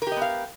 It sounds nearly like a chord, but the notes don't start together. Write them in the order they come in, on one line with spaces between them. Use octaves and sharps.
A#4 G4 D#5 B3 F5